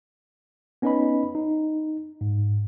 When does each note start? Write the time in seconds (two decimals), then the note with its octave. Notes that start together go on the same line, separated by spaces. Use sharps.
0.82 B3 C#4 D#4 B4 D#5 B5
1.35 D#4
2.21 G#2